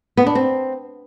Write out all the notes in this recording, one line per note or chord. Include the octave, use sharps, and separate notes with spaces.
B3
D4
C4